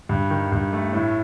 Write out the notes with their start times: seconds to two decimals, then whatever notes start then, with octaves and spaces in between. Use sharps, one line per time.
0.09 G2
0.30 D#3
0.52 G2
0.73 A3
0.93 A2